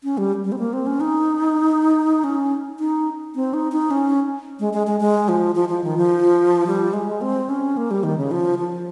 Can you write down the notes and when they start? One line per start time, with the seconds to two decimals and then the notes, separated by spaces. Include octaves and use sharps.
0.04 C#4
0.18 G3
0.45 G3
0.52 C4
0.58 A#3
0.73 C4
0.87 C#4
1.00 D#4
2.24 C#4
2.80 D#4
3.35 C4
3.54 D#4
3.72 D#4
3.91 C#4
4.60 G#3
4.73 G#3
4.87 G#3
5.00 G#3
5.29 F3
5.55 F3
5.69 F3
5.84 D#3
5.98 F3
6.67 G3
6.93 G#3
7.21 C4
7.49 C#4
7.77 A#3
7.91 G3
8.04 D#3
8.18 C#3
8.31 F3
8.59 F3